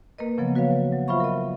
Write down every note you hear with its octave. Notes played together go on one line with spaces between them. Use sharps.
A#3 A#4 B4 D#5
C#3 F3 F#3 B3
F#4 B4 C#5 F5
F#3
F4 C5 E5 F5 B5 C#6
A#4 D#5